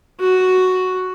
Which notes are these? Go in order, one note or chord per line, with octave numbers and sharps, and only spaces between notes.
F#4